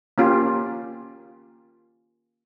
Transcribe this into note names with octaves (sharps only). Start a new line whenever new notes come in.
A#3 C#4 F4 G4